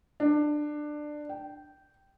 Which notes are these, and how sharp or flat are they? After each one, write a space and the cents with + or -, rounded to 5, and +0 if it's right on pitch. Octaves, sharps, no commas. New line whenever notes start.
D4 +20
G5 -10